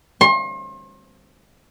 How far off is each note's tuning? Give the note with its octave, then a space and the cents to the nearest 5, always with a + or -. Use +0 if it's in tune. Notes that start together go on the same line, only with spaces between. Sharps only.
C6 +40